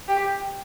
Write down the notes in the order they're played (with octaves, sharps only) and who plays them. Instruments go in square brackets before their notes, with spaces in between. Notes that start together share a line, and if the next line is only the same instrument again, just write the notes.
[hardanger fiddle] G4